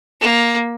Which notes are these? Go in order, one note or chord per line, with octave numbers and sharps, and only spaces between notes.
A#3